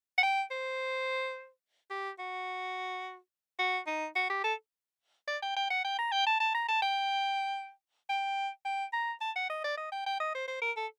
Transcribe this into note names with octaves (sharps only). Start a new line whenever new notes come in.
F#5
G5
C5
G4
F#4
F#4
D#4
F#4
G4
A4
D5
G5
G5
F#5
G5
A#5
G5
A5
A5
A#5
A5
G5
G5
G5
A#5
A5
F#5
D#5
D5
D#5
G5
G5
D#5
C5
C5
A#4
A4